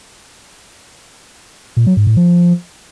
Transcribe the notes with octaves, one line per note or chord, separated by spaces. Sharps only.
A#2
F#3
G#2
A2
F3